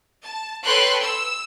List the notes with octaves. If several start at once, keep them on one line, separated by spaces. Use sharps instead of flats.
A5
A4 B4 C#5 G5 C6 F#6
E6